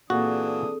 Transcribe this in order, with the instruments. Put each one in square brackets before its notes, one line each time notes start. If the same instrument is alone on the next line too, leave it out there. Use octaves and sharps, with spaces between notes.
[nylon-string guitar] A#2 [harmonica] E3 D4 D#6 [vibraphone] C4 G#4 A4 [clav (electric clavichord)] F#4